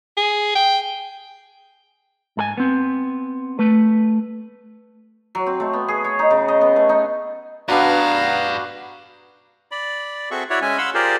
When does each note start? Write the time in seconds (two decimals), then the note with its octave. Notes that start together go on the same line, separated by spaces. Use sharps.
0.17 G#4
0.55 G5
2.37 G#2 A4 G#5
2.58 B3 C4
3.59 A3 B4
5.35 F#3
5.46 C4
5.60 A3
5.73 B3
5.88 G#4
6.04 C#5
6.19 D#4
6.31 C#3
6.48 D#5
6.61 B3
6.76 A3
6.89 D#4
7.69 B3 D4 F#4 B4 D5 F5 A#5
9.71 D5 B5
10.31 C4 F#4 G#4 A4 E5 C#6
10.50 E4 F#4 C#5 D5 E5 F#5
10.62 G#3 C#4 E5 G#5
10.78 F5 F#5 B5 C6 E6
10.94 F4 G4 G#4 A#4 C5 D5